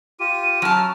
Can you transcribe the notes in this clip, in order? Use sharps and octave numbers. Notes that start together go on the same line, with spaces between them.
F4 G4 D#7
F#3 C#4 A5 F6